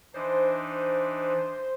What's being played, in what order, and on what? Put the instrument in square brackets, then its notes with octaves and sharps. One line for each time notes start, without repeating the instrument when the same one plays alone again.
[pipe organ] E3 D4 D#4 [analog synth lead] C5